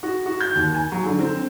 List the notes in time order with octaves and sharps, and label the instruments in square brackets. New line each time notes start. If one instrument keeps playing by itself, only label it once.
[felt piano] F#4
F#4
G6
D#2
G#5
F#3
D3
C4